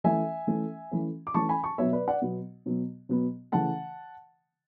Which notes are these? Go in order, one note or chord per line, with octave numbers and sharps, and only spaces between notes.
E3 A3 C#4 E5 G#5
E3 A3 C#4
E3 A3 C#4
D6
E3 A3 C#4 A5 C#6
G#5 B5
A5 C#6
B2 F#3 B3 C#5 E5
B4 D5
D5 F#5
B2 F#3 B3
B2 F#3 B3
B2 F#3 B3
C#3 E3 A3 F#5 A5